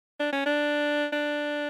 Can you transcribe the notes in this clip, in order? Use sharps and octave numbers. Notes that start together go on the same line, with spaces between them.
D4
C#4
D4
D4